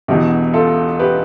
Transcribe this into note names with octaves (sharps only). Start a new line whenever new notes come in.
E1 E2 B2 G4
F4 A4
G4 B4